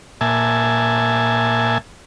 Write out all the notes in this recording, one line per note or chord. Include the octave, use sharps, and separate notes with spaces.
A#2 E5 G#5 A5